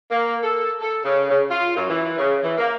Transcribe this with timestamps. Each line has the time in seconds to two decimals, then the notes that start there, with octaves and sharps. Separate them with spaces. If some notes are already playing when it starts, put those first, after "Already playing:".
0.10 A#3
0.43 A4
0.80 A4
1.04 C#3
1.30 C#3
1.50 F4
1.76 F#2
1.89 E3
2.18 C#3
2.43 E3
2.58 A#3